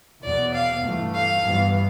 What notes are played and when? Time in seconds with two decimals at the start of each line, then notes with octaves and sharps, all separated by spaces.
0.23 E2 B2 B3 D5
0.54 F5
0.83 G2 E3 A3
1.14 F5
1.44 G2 E3 B3